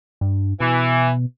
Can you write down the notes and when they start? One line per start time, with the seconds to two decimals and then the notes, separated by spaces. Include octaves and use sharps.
0.21 G2
0.60 B2 E3